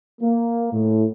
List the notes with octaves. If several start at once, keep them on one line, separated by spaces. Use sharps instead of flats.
A#3
A2